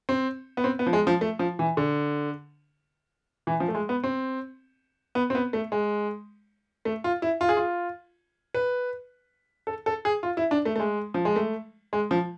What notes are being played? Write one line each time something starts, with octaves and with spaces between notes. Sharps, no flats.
C4
B3
C4
B3
F3
G#3
F3
A3
F3
E3
D3
E3
F3
A3
G#3
B3
C4
B3
C4
B3
A3
G#3
A3
F4
E4
F4
G#4
F4
B4
A4
A4
G#4
F4
E4
D4
A3
A3
G#3
F3
G#3
A3
G#3
F3